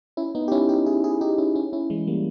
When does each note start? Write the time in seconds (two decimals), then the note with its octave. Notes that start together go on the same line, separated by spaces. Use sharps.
0.17 C#4 E4
0.35 B3 D#4
0.48 G4
0.52 C#4 E4
0.69 D#4 G4
0.86 E4 G#4
1.04 E4 G#4
1.21 D#4 G4
1.38 C#4 E4
1.55 C#4 E4
1.73 C#4 E4
1.90 E3 G#3
2.07 G3 A#3